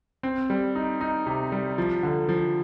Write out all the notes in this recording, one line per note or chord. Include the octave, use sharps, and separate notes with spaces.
C4
G3
D#4
D#4
C3
G3
F3
D3
F3